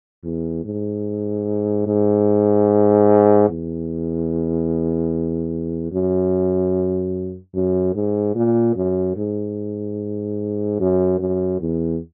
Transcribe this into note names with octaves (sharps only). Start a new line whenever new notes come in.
E2
G#2
G#2
E2
F#2
F#2
G#2
A#2
F#2
G#2
F#2
F#2
E2